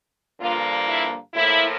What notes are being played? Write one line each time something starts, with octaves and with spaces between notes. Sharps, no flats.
G2 D3 F3 A#3 F4
E4
A2 F3 A#3 E4